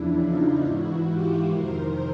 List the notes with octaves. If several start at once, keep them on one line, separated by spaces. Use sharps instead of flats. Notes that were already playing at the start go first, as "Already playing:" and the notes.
Already playing: E2 C#3 F3 D4 E4
D#4 F4
G#2 E3 E4 F#4
F4 G4
F2 C3 D#3 A#4 C5